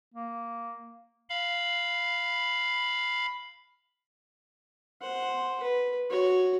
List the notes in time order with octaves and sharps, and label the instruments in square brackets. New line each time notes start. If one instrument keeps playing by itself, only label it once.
[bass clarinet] A#3
[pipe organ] F5 B5
[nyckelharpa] C5 F#5
B4
F#4 C#5